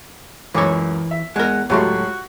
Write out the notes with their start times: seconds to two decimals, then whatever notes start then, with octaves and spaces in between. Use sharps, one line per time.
0.54 C#2 F#2 E3 C#5 D6
1.11 E5
1.36 E2 G#3 A#4 F#5
1.70 C#2 A2 F#3 A3 F#4 G4 C6